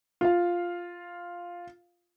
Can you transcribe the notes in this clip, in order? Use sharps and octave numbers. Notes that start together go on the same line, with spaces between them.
F4 F5